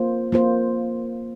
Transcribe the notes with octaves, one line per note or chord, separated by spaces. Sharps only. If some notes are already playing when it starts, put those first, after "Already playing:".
Already playing: A#3 F4 C5
A#3 F4 C5